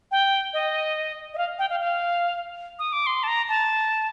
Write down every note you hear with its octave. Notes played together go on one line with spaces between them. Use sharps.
G5
D#5
D#5
F5
G5
F5
F5
D#6
D6
C6
A5
A#5
A5